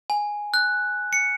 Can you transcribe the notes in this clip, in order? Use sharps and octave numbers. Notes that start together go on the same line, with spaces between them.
G#5
F#6
C#7